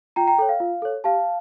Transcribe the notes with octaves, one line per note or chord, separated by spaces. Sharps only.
F4 G5 A#5
G5 A#5
A4 C#5 G5
F5
F4
A4 C#5
G4 F5 A5